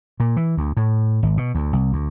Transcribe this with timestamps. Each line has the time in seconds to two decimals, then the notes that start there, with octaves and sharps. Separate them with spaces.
0.20 A#2
0.37 E3
0.57 D2
0.77 A2
1.23 G#1
1.37 B2
1.55 D2
1.73 C2
1.93 D2